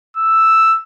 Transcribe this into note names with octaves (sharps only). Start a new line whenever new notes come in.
E6